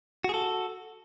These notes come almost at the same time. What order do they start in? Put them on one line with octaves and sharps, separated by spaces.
F#4 G#4 A4